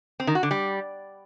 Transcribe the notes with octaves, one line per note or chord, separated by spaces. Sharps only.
C4
D#3
F#4
D3
G3